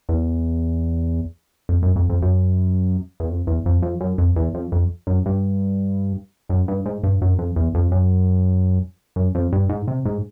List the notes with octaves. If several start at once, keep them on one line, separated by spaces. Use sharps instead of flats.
E2
F2
F#2
F2
F2
F#2
E2
F2
E2
F2
F2
F#2
F2
E2
F2
F2
F#2
G2
F#2
G2
G#2
G2
F#2
F2
E2
F2
F#2
F#2
F2
G2
G#2
C3
G#2